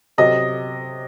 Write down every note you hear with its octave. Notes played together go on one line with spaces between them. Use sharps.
C3 F#3 D#5